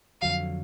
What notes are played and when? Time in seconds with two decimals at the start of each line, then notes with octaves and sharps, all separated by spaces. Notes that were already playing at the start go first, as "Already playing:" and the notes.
0.21 F2 D3 F#3 F5